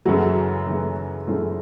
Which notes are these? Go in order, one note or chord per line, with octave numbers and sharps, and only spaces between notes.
F#2 C#3 E3 F#3 A3 F#4
F#2 C#3 E3 A3
F#2 C#3 E3 F3 A3 F4